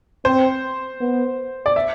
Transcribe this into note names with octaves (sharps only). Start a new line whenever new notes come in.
C4 C5
B3
D5
E5